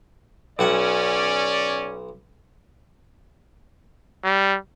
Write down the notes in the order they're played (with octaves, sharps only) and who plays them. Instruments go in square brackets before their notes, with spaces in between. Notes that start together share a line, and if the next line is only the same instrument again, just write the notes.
[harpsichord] B1 F#4 F#5 [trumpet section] C#4 D5
[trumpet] G3